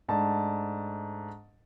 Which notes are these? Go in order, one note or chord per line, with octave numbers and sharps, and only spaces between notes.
G#2 A3 D4 A5